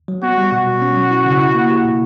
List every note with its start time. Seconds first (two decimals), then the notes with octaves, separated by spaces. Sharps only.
0.08 F#3
0.23 B3 F#4
0.38 G3
0.52 B2 F#4
0.67 B2
0.82 C#4
0.96 F#3
1.11 E4
1.26 C#3
1.41 E4
1.55 A#3
1.70 G4
1.85 B2